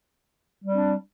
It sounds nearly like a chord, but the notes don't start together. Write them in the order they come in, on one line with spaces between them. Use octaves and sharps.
G3 C4 D4